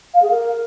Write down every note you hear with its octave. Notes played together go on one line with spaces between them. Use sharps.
F5
G#4
A#4